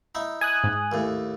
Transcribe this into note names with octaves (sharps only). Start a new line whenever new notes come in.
D#4 E4
G#5 D#6 F#6
G#2
D#2 A2